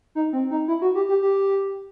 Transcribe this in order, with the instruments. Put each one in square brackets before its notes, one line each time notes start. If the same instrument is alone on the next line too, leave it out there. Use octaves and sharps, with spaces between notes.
[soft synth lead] D#4
C4
D#4
E4
F#4
G4
G4
G4